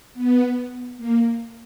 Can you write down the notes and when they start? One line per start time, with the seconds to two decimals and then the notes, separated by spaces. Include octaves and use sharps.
0.14 B3
0.98 A#3